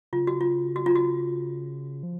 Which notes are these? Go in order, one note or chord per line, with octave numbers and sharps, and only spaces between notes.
C#3 F4
F#4
F4
F#4
F4
F#4
F3